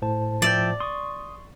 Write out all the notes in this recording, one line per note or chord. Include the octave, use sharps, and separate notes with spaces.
A2 C5 A5
F3 D5 E5 G5
C6 C#6 D#6